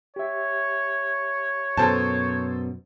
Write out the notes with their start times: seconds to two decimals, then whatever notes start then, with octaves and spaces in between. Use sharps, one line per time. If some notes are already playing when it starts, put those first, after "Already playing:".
0.16 G4 C#5 E5
1.77 F#2 B2 A4 C5 A5